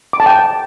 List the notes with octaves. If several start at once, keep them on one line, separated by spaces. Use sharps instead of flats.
D6
A5
G5